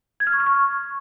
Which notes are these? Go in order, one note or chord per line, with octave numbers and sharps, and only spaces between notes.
G#6
F6
C#6
F6
C#6